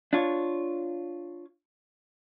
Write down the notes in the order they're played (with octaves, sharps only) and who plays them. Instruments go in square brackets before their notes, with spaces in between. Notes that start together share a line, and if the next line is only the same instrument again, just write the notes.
[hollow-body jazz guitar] D4 F4 C#5